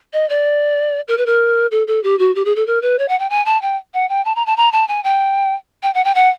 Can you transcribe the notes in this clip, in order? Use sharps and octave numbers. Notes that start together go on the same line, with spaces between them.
D#5
D5
A#4
B4
A#4
A4
A4
G4
F#4
G4
G#4
A4
A#4
B4
C#5
F#5
G5
G#5
A5
G5
F#5
G5
A5
A#5
A5
A#5
A5
G#5
G5
G5
F#5
G5
F#5